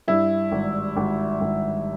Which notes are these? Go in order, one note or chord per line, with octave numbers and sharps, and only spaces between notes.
G2 E4
G#1
G#1
G#1